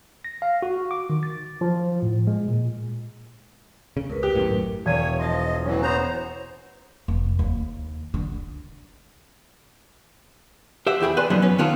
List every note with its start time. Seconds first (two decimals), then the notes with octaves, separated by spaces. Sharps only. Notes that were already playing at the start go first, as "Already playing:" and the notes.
0.25 A#6
0.42 F5
0.62 F#4
0.91 D6
1.10 D#3
1.23 A6
1.61 F3
2.02 A2
2.27 G#3
2.48 A#2
3.97 C#3
4.10 C#2 A#4 B4
4.23 G4
4.35 G#1 F#2 A2
4.85 E1 C#5 G#6 D#7
5.19 F3 D#5 C6 A6
5.65 A2 E3 F#3 C#4
5.82 B3 C5 A#5 F#6
7.08 F1
7.39 D#2
8.14 D3
10.87 G4 C5 E5 F#5
11.00 E2 E4 G4 G#4 B5
11.17 B4 D5 G#5 C6
11.30 F#2 F3 F#3 B3 D4 D#4
11.42 C#4 B4
11.58 D#3 B3 C4 F4 A4